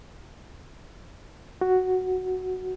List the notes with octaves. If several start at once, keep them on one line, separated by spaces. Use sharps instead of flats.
F#4